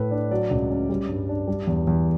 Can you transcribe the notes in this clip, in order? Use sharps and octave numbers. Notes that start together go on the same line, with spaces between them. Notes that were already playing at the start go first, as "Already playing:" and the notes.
Already playing: A2 A3 B4
D4
F#3 D5
C#2
C#4
G3
G2
D4
G3
E2
E2